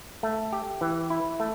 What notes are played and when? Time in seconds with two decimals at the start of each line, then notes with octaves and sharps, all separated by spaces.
0.23 A3
0.52 G4
0.81 E3
1.10 E4
1.40 A3